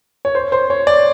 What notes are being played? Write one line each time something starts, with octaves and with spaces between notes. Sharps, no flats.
C#5
C5
C5
C#5
D5